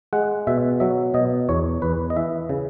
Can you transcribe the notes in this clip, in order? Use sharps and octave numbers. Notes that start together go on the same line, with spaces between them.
G#3 F#5
B2 E5
F#3 E5
B2 D#5
E2 C#5
E2 B4
D#5
E3 E5
C#3